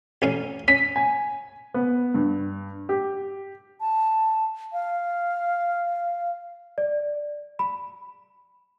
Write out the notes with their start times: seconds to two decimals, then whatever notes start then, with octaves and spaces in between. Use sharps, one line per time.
0.22 A1 C#4 F5
0.68 C#4 B6
0.96 G#5
1.74 B3
2.14 G2
2.89 G4
3.81 A5
4.73 F5
6.78 D5
7.59 B5